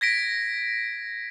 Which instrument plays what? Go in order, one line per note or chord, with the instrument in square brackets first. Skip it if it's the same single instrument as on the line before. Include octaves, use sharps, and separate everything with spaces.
[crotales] G#6 A#6 B6 D7